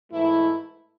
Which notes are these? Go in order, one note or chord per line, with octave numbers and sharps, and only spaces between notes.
G#2 E3 A3 E4